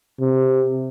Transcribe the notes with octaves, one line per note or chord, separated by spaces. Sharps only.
C3